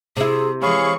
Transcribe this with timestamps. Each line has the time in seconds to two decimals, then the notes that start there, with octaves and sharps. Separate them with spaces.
0.17 C3 E4 G#4
0.62 E3 G#3 G#4 C#5 F5 B5 C#6